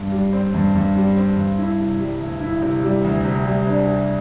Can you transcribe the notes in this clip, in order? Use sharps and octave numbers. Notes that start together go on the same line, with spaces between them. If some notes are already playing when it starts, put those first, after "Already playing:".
Already playing: G2
G3
C4
G2
G2
G3
C4
G2
E4
C3
G3
D2
E4
C3
G3
D2
C3
G3
D4
C3